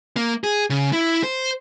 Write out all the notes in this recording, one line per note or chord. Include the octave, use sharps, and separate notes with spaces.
A#3
G#4
C#3
E4
C5